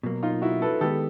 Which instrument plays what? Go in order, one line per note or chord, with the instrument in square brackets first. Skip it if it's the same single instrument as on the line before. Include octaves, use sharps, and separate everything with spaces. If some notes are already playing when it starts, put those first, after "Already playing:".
[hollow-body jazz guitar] B2 F#3 A#3
[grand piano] D#4 F4
E4 F#4
A4 B4
[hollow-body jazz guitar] D#3 G#3 B3 [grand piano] G4 A4